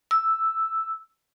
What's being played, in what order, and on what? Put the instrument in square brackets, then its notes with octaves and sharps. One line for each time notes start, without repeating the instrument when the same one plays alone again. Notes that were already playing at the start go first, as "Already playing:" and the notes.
[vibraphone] E6